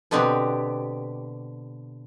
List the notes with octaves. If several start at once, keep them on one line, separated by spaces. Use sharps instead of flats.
B2 D3 B3 C4 G4